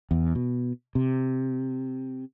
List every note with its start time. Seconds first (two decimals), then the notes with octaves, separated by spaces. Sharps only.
0.11 E2
0.35 B2
0.95 C3